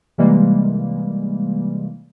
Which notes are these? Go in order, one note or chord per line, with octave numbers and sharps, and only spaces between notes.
C3 E3 G3 G#3 A#3